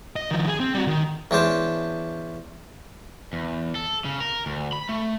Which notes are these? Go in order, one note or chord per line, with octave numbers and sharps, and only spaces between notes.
D#5
D#3 F3
G#4
C4
G3 F#4
D#3
E2 C#4 D4 C5 A5
E2
A4
C#3
A#4
D2
B5
A3